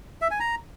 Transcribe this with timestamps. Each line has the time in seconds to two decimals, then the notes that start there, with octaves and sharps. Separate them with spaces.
0.22 E5
0.31 G#5
0.40 A#5